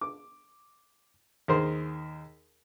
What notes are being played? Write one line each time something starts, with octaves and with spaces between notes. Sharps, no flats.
D6
D#2 G#4 A#4 C5